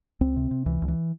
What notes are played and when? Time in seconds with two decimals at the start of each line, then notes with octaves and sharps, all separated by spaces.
0.21 C#2 C4
0.36 C3
0.51 C3
0.66 C#2 E3
0.82 C#2
0.88 E3